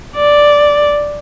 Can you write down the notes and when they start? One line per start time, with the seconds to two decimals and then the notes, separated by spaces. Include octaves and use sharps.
0.16 D5